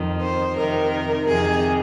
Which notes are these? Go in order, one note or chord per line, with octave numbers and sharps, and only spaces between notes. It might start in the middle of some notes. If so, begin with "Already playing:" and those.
Already playing: F2 D#3
C5
F2 C3 D#3 A#4
F2 C3 D#3 G#4